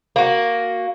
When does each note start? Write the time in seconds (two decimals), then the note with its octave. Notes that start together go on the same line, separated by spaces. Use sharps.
0.16 A#3 F#4